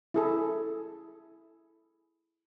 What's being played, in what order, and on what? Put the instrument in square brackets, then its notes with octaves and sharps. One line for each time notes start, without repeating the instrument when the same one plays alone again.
[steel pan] E4 G#4 A4